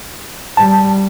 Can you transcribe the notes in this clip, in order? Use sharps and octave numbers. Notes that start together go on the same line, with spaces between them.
G3 A5